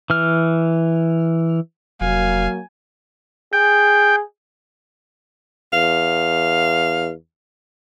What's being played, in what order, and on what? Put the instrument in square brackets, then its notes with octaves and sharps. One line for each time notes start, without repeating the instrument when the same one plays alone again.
[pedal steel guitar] E3 F6
[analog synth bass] F1 [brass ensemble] F#3 A#3 [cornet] F5 [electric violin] G#5
[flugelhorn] G#4 [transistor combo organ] G5
[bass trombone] E2 [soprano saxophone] F5